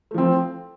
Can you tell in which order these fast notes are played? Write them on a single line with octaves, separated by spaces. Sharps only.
A3 F3 C4